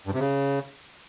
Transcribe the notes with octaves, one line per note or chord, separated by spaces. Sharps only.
G2
C3
C#3